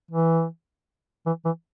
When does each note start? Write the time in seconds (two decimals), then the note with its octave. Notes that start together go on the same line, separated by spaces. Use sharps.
0.11 E3
1.26 E3
1.45 E3